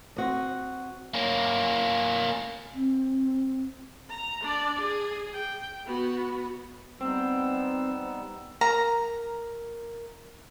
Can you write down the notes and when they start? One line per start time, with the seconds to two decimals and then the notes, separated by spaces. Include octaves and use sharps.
0.16 C4 F#4 D#5
1.14 A#3 C#4
2.74 C4
4.10 A#5
4.43 D4 D5
4.81 G#4
5.34 G5
5.87 B3 F#4
7.01 G3 B3 C4 D#4 E6
8.61 A#4 A#5